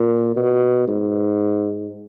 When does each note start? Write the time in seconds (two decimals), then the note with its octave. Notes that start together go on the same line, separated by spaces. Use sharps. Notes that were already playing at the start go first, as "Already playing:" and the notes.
Already playing: A#2
0.36 B2
0.88 G#2